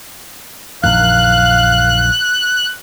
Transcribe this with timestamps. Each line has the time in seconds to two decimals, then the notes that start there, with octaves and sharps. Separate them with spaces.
0.84 A#1 F#2 D#3 F5 F#6